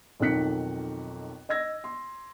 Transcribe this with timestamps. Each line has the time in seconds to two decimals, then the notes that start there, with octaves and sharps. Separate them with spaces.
0.20 B1 F2 D#3 F#6 B6 C#7
1.49 D#5 E6 G#6 A#6
1.84 C6